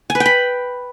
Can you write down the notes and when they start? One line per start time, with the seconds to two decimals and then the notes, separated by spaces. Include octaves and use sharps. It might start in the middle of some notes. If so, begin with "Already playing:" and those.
0.10 G#5
0.15 B4
0.20 G5
0.26 B5